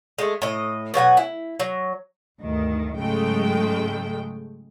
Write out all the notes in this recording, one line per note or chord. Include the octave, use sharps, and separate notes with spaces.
G#3 A3
A2 D#5
B2 F#3 F#5 G#5
E4
F#3
D2 G2 D#3
G#2 C#3 F#3 G#3 A3 G5